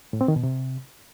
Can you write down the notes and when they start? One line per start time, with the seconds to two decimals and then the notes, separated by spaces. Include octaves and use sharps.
0.13 A2
0.21 C4
0.28 D#3
0.36 B2
0.43 C3